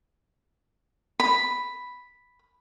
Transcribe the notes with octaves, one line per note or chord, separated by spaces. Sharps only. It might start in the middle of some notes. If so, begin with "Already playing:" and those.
B5